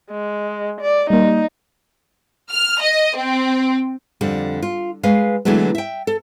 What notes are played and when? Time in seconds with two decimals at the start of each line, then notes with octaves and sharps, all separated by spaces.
0.11 G#3
0.81 D5
1.10 G3 A#3 D#4
2.51 F6
2.81 D#5
3.15 C4
4.21 F2 D3 G3
4.62 F4
5.03 G#3 B4 F5
5.45 D3 E3 F#3 G#3 A3 B3
5.75 E5 G5
6.07 A4